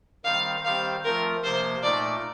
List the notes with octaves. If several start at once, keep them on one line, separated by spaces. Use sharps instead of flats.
D#3 G3 C4 F5
D#3 G3 C4 G4 C5 F5
F3 A3 C4 F4 A#4
C3 F3 A#3 C5
A#2 A3 D#4 A#4 D5